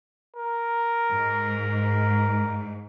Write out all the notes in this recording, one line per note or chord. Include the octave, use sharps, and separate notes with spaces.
A#4
G#2